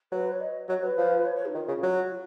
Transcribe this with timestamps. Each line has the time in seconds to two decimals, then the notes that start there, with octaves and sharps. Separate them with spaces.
0.12 F#3 B4
0.32 C#5
0.40 D#5
0.69 F#3 C#5
0.83 F#3 B4
0.98 F3
1.25 C#5
1.35 C#5
1.45 D#4
1.54 D#3 F4
1.68 C#3
1.82 F#3 F#4
2.11 F4